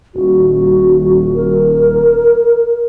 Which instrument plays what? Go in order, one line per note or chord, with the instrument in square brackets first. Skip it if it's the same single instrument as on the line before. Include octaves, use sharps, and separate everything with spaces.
[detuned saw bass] D#1 [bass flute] F#4
[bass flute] A#4